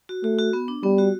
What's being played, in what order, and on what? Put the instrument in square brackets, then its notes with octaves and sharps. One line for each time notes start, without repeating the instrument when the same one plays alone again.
[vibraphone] F#4
[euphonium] A3 [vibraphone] F#4
[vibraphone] F#4
B3
D4
[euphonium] G3 [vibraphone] B3
[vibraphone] F#4